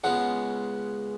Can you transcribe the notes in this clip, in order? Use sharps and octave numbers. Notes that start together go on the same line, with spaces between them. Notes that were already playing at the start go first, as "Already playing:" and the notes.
C#2 C#3 G#3 B3 F#5